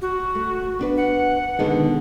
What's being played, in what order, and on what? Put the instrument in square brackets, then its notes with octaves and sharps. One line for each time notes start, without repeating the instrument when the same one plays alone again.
[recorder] F#4
[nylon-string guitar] A3
B3 D4 B4
[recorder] F#5
[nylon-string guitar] B2 D3 [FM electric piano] D#3 G#3 B3